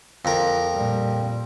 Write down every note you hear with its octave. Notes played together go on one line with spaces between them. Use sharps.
F2 A#4
A#2 G3